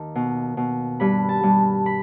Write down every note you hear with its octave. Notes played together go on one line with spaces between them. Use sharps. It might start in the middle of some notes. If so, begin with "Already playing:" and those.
Already playing: D#2 D#4 A5
B2
B2
G2 B5
A5
G2
B5